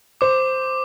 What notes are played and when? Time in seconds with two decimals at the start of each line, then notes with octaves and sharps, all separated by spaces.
0.21 C5 D6